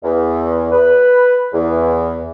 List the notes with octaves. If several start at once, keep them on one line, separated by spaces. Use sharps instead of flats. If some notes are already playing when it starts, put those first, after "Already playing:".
E2
B4
E2